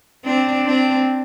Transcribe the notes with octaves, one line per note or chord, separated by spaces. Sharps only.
C4 D4
C4 D4